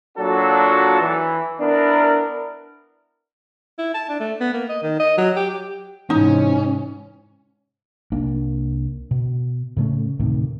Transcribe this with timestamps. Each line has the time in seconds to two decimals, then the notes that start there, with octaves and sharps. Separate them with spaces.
0.18 A#2 F#3 D4 F4 F#4 A4
1.01 E3
1.61 B3 D4 E4 A#4
3.79 E4
3.94 A5
4.09 D4
4.20 A3
4.41 B3
4.53 A#3
4.69 D#5
4.83 D#3
5.00 D#5
5.18 F#3
5.36 G4
5.50 G4
6.10 G#2 C3 E3 C#4 D#4
8.12 C2 A#3 D4
9.11 B2
9.77 A2 C#3 A3 C#4
10.20 D2 A2 C3 D#3